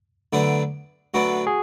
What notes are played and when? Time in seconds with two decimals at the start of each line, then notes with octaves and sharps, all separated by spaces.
0.33 D2 D3 F#3 B3 D4
1.14 D2 D3 F#3 B3 D4 F#4
1.47 G#4